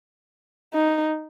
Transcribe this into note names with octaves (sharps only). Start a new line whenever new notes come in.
D#4